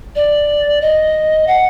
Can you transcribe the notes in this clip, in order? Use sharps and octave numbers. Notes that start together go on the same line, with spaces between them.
D5
D#5
F#5